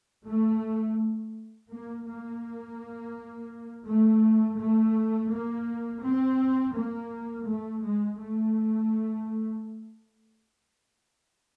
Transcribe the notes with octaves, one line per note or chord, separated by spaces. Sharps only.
A3
A#3
A#3
A3
A3
A#3
C4
A#3
A3
G#3
A3